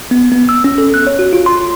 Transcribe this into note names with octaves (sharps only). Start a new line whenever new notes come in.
B3
B3
E6
C#4
A4
F#6
C#5
F#4
F4
C6